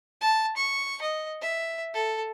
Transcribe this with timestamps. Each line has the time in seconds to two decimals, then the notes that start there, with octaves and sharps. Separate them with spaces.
0.21 A5
0.57 C#6
1.02 D#5
1.42 E5
1.94 A4